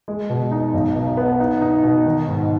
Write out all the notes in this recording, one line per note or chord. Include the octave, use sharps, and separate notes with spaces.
G#3
B2
D#4
B1
B2
B3
D#4
D#4
B2
D#3
G#2